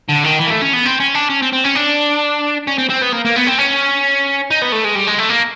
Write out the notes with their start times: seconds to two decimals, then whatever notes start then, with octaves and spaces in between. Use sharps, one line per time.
0.09 D3
0.24 D#3
0.39 E3
0.47 A#3
0.50 A3
0.61 C#4
0.73 B3
0.85 C4
1.00 C#4
1.15 D4
1.30 C#4
1.42 C4
1.53 C4
1.65 C#4
1.76 D4
2.67 C#4
2.78 C4
2.90 C4
3.02 B3
3.13 A#3
3.25 A#3
3.36 B3
3.47 C4
3.58 C#4
4.50 D#4
4.62 B3
4.72 A3
4.84 G#3
4.95 G3
5.07 G#3
5.18 A3
5.29 A#3